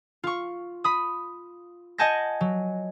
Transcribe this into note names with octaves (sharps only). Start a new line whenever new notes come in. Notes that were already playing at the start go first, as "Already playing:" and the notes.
F4 C#6
B5 D#6
D#5 F#5 G#5 A5 G6 A#6
F#3